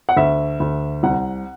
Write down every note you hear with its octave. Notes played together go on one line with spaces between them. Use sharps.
F#5
D2 E5
D2
C2 F#5